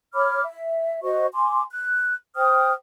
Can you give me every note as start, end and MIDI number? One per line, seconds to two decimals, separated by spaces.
0.14 0.42 73
0.14 0.42 83
0.14 0.42 86
0.14 0.42 89
0.44 1.01 76
1.03 1.26 66
1.03 1.26 72
1.03 1.26 75
1.03 1.26 85
1.33 1.62 80
1.33 1.62 84
1.33 1.62 86
1.70 2.15 90
2.36 2.72 72
2.36 2.72 79
2.36 2.72 87
2.36 2.72 89